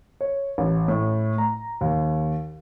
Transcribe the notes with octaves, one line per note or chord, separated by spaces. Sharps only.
C#5
A1
A2
A#5
D#2